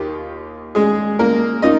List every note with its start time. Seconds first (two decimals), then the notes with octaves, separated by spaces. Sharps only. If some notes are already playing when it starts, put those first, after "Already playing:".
Already playing: D#2 D#3 A#3 F4 G4
0.75 G#3 G#4
1.19 A#3 A#4
1.62 A#3 D#4 F4 D#5